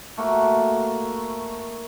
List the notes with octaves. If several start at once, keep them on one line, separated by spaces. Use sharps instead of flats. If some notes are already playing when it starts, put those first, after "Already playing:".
A3 A#3 F#4